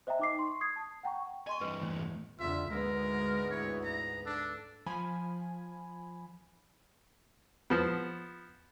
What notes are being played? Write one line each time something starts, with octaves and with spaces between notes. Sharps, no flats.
C5 D#5 E5 G5 A#5
D#4 D6 C7
C6 C#6
D#6 G#6 C7
A5
F#5 G5 A#5 C#6
D#5 G#5 C6 C#6
G2 E3 B4
E2 A2
F2 D3 F4 E5
D2 G#2 G#3 B3 A#4
E4 C#5
A#5
D4 A4
F3 G#5 B5
F3 B3